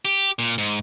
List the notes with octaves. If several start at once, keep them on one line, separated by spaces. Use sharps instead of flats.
G4
A#2
G#2